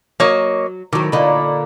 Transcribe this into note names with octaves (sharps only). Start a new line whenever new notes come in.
F#3 A#3 C#5 D#5
A2 D#3 F#3 D6
A#2 D3 A#3 D#4 B5